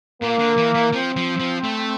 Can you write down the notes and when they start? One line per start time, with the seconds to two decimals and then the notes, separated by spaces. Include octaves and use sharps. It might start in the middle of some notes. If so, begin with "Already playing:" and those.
0.22 A#2 A#3
0.39 D3
0.58 E3
0.75 E3
0.93 F3 C4
1.16 F3
1.40 F3
1.64 A3